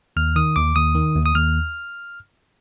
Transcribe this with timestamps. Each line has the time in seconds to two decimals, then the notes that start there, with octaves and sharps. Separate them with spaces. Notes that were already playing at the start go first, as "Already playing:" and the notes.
0.17 D#2 F6
0.36 D#3 D#6
0.56 D#2 D6
0.76 D#2 D#6
0.95 D#3
1.15 D#2
1.26 D#6
1.35 D#2 F6